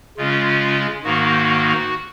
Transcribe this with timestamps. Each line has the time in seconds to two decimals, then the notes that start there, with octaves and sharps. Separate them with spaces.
0.17 C#3 G#3 C#4 F4
1.04 G#2 D#3 A#3 F#4